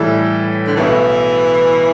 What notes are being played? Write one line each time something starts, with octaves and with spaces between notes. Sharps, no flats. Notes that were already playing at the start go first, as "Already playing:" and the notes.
Already playing: A2 E3 G3 E4 A4
D3
B1 B2 E3 A3 E4